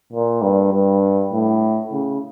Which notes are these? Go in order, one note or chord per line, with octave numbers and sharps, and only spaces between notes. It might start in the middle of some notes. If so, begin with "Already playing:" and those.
A#2
G2
G2
A2
C#3